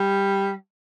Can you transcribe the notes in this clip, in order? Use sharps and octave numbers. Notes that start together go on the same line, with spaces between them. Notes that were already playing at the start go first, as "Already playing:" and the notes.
Already playing: G3